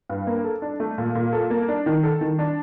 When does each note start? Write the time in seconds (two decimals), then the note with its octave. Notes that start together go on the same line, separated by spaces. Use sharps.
0.09 G2
0.27 A#3
0.44 A4
0.62 D4
0.80 A3
0.98 A#2
1.15 A#2
1.33 A4
1.50 A#3
1.68 D4
1.86 D#3
2.03 A4
2.21 D#3
2.39 D4